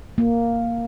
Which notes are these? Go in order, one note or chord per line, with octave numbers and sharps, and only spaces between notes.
A#3